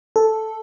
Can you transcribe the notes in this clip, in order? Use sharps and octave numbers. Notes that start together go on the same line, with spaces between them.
A4